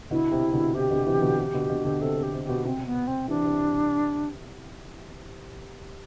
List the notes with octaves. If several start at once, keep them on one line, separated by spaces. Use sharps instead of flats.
B2 D3 E4
C3
B2 D3
C3 G4
B2 D3
C3 E3
B2 D3
C3
B2 D3
B2 D3
B2 D3
C3 A4
C3
G4
C3
B2 G4
C3 C4
B3
C4
C3 E3 D4
C3